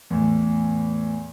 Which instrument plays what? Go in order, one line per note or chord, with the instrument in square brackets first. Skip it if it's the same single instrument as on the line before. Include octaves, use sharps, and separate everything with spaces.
[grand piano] E2 A2